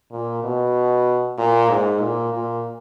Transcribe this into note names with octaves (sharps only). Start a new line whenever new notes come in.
A#2
B2
A#2
G#2
A#2
A#2